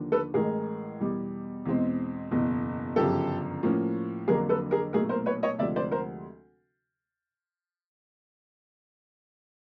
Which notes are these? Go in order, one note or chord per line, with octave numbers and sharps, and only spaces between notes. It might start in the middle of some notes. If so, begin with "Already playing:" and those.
Already playing: D#2 D3 F3 A#3 D4
A4 B4
A1 A2 E3 G#3 G#4 A#4
E2 B2 G3
E2 B2 G#3 C4
F#1 E2 B2
G1 F#2 C#3 F3 G4 A4
A2 F3 A#3 C#4
F2 D3 F#3 A#3 D4 G#4 A#4
A4 B4
G#4 A#4
B1 A#2 F#3 A3 G#4 A#4
A#4 C5
B4 C#5
C#5 D#5
D2 C3 F3 G#3 D5 E5
C5 D5
A#4 C5